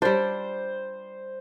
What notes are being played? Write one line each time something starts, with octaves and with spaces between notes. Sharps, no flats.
G3 D4 C5